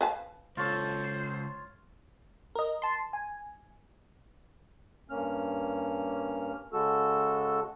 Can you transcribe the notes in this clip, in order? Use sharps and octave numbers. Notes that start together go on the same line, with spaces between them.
B4 F5 A5
C#2 F4 A4 C5 C#5
A#4 D#5
A5 C6
G#5
G2 A#3 C#4 F6
C#3 G#3 F#4 A4 E6